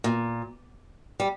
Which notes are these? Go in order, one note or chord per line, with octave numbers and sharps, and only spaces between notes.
A#2
G3